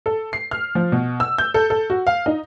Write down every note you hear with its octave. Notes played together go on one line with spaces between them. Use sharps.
A4
C7
F6
F3
B2
E6
G6
A4
A4
F#4
F5
D#4